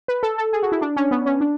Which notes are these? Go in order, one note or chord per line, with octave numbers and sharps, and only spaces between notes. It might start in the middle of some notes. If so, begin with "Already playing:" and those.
B4
A4
A4
G#4
F#4
E4
D4
C#4
B3
C#4
D4